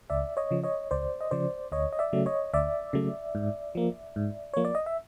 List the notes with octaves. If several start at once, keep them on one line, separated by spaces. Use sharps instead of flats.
C#2 D5 E5
C#5 D#5
C#3 F3
C#5 D#5
C#2 C5 D5
D#5
C#3 F3 C5 D5
D2 C#5 D#5
D#5
D5 E5
C#3 F#3 A3
C#5 D#5
D2 D5 E5
C#3 F#3 A3
G#2
F3 A#3
G#2
F3 A#3 C#5
D5
D#5
E5